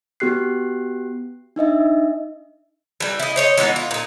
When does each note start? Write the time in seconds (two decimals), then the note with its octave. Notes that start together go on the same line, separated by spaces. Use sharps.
0.20 B3 F#4 G4 F#6 C7
1.56 D4 D#4 D#5 E5
3.00 E3 G3
3.20 E4 D#5
3.36 C5 C#5 D#5
3.57 E3 G#3 B3 D#4
3.76 F4
3.91 A#2 D#4